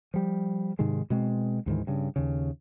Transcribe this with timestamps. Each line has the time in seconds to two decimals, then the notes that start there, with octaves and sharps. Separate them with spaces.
0.14 F3 G3
0.79 G#2 C3 D#3 G#3
1.10 B2 G#3 C4
1.66 D2 G#2 D#3 E3
1.87 G2 C#3
2.16 D#2 C#3